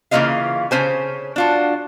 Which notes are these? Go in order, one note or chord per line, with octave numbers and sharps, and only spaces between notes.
C#3 E3 A#3 F4 D#5 F5
C#3 C#4 C5 G#5
D4 F4 F#4